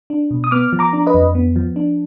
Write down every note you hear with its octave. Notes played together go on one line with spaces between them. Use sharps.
D4
B2
D#6
B3 D6 F6
F3
A#5 D6
D4
B4 D#5
F2
B3
F3
D4